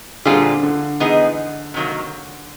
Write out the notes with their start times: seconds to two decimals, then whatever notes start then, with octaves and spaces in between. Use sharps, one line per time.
0.25 A#2 D3 G3 C4 F4 G#4
0.63 D3
1.00 E3 G#3 B3 D#4 G#4
1.74 C3 D#3 F#3 A#3